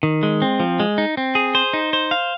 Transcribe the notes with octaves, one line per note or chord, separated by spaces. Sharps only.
D#3
G#3
C4
F3
G#3
D#4
C4
G#4
C5
D#4
C5
F5